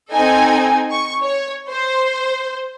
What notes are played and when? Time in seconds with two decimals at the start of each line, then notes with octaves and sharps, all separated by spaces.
0.12 C4 D#4 A4 G#5
0.91 C#6
1.23 C#5
1.68 C5